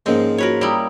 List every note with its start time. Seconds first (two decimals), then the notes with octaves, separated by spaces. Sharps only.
0.06 G#2 F3 G#3 A#3 C4 C#4 D#5
0.38 F4 F#4 A#4 B4 C#5
0.61 G3 E4 G5 A#5 D#6